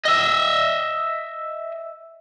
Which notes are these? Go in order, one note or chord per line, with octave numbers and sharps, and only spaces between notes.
D#5 E5